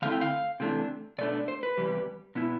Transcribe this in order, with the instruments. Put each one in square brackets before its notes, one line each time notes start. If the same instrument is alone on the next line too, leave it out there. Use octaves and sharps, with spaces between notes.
[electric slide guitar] D3 A3 C4 E4 F5
G5
F5
C3 E3 A3 D4
B2 A3 D4 D5
D5
C5
B4
E2 C3 G3
B2 B3 E4